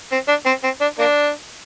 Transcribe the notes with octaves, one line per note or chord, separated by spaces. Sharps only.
C4
D4
C4
C4
D4
A#3 D4